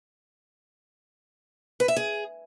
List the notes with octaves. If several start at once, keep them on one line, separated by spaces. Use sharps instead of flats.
B4
E5
G#4